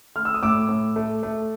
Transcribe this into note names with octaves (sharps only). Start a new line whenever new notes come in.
A3 F6
E6
D#6
A2 D6 E6
A2
A3
A3